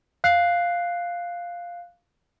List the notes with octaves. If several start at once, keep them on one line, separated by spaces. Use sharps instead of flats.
F5 F#6 C7